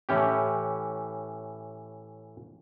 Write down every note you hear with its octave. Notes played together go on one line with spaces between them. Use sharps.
A2 E3 C#4 G4